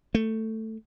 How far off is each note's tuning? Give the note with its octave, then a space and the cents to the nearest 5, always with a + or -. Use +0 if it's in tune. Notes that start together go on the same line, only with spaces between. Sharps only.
A3 +10